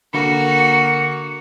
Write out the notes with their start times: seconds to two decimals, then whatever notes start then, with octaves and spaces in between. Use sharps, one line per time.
0.14 D3 A#3 F#4 C#7